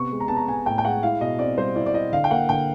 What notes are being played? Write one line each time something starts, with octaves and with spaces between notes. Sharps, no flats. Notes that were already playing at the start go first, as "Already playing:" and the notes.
Already playing: C3 B3 C#6
G#3
A#5
B3 A5
A#5
B3 G#5
A2 G5
G5
G#3 F#5
E4 F5
B2 D#5
C4 D5
G3 C5
E4 D5
D5
E4 D#5
D3 F5
G5
A#3 F#5
D3 G5